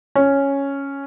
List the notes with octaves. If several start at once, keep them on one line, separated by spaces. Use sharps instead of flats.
C#4